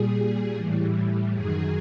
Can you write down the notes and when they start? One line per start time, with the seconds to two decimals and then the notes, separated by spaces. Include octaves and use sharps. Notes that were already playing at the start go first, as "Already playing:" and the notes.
Already playing: A#2 G3 G#4
0.54 A2 E3 G3
1.34 F#2 D#3 F#3 G#4